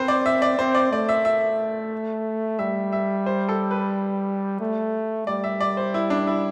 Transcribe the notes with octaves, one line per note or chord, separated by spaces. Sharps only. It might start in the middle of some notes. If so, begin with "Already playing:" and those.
Already playing: C4 B4 C5
D5
E5
D5
C4 C5
D5
A3 D5
E5
E5
G3 E5
E5
C5
A4
B4
A3
G3 D5
E5
D5
C5
E4
D4
E4